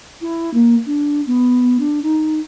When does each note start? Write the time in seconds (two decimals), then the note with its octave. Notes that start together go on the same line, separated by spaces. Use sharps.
0.21 E4
0.54 A#3
0.86 D4
1.27 B3
1.80 D4
2.03 D#4